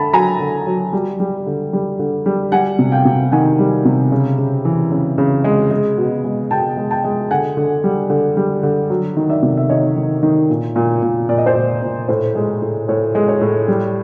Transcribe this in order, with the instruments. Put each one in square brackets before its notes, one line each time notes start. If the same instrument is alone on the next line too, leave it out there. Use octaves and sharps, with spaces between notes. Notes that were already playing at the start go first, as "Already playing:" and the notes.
Already playing: [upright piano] D3 A5 B5
F#3 G#5 A#5
D3
F#3
G3
G3
D3
G3
D3
G3
G3 F#5 G#5
C3
F5 G5
C3
D#3 F#5 G#5
G3
C3
C#3
C#3
E3
C#3
C#3
G#3
G#3
B2
G#3
B2 G5 A5
G#3
G5 A5
G#3
D3 F#5 G#5
D3
G3
D3
G3
D3
F#3
D#3
D5 E5
C3
E5
D#3 C#5 D#5
D#3
D#3
A#2
A#2
A#2
A#2 D5
D#5
C5 D5
A#2
A#2
A2 C5
G#3
A2
A2 C#5
G#3
C#5
A2
G3